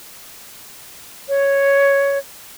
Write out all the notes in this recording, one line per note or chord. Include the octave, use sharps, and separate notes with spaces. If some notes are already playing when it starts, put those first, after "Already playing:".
C#5